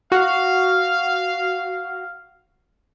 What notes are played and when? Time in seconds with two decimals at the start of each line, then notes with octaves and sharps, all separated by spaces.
0.12 F#4 F5